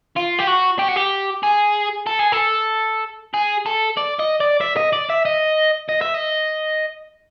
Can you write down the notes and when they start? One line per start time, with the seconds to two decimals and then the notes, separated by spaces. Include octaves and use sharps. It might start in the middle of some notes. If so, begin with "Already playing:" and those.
0.17 F4
0.39 G4
0.48 F#4
0.79 G4
0.89 F#4
0.96 G4
1.43 G#4
2.07 A4
2.19 G#4
2.32 A4
3.34 G#4
3.66 A4
3.97 D5
4.20 D#5
4.40 D5
4.61 E5
4.77 D#5
4.93 D5
5.10 E5
5.25 D#5
5.89 D#5
6.01 E5
6.14 D#5